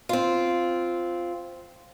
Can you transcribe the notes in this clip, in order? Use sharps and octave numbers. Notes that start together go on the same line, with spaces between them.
C4 F4